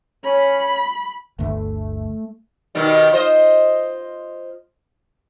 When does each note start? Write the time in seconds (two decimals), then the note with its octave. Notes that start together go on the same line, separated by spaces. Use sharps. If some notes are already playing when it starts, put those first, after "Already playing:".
0.25 C#4 B5
1.39 G1 D2 A3
2.75 B2 D#3 G3
3.13 F4 C5 D#5